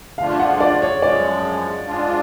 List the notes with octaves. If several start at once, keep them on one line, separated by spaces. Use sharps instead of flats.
D3 F3 A3 D4 F4 F5
F#5
D5
C#5
F#2 F3 G#3 D5
G#2 G#3 D4 F4